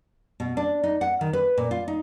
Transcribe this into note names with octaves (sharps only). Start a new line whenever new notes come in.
B2
D4
D#4
F#5
D#3
B4
A#2
F4
D#4